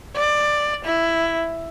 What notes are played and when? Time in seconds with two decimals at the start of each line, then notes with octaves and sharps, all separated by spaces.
0.16 D5
0.85 E4